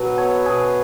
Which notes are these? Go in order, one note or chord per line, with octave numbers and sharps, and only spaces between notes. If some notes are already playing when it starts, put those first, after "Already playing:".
Already playing: B2 F#3 F#4 B4
B3 A4 C#5
B2 G#4 B4